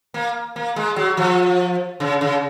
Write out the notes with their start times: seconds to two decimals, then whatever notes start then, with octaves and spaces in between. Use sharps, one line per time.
0.14 A#3
0.56 A#3
0.76 G#3
0.96 F#3
1.17 F3
2.00 C#3
2.21 C#3